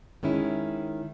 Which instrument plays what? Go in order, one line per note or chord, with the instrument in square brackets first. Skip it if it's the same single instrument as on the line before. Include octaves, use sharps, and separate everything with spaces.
[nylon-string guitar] D#3 G#3 C#4 E4